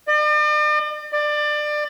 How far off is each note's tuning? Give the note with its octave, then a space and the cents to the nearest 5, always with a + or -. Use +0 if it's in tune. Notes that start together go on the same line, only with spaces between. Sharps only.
D5 +45
D5 +25